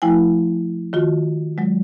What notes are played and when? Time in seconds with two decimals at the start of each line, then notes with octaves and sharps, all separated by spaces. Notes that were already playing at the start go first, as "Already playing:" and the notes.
0.02 F3 A3 E4 G5 G#5
0.93 D#3 F4 F#4
1.58 F#3 G#3